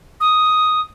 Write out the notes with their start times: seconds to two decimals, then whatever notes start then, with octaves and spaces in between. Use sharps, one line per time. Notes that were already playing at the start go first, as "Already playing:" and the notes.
0.20 D#6